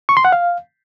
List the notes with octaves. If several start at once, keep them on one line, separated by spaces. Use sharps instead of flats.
C#6
C6
F#5
F5